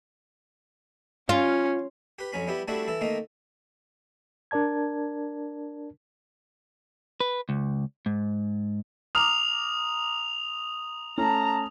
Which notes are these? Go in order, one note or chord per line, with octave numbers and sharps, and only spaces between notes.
C#4 F4
G4 B4
F2 F#3 C#4 B5
G3 B3 E4 G4
G3 A3 C4 D4 E4 F#4
E3 E4 A4
D#3 A3 A#3 C4 D#4
D4 A#4 D5 A5 G#6
B4
C#2
G#2
A#5 D6 D#6 F6 F7
A3 C#4 A5 A#5